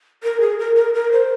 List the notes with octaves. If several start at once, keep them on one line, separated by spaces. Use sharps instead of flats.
A#4
G#4
A#4
A#4
A#4
C5